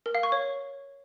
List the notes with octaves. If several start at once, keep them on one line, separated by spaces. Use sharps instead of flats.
A#4
F5
C#6
C#5